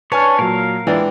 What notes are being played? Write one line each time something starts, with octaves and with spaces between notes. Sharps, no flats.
D4 B4 C#5 G#5 A5 F6
A#2 F#3 A#4 F5
E3 G#3 B3 D4 G5